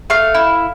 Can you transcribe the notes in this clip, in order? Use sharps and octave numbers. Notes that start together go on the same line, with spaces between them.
A3 F5
E4